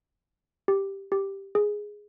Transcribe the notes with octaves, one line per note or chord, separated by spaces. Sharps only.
G4
G4
G#4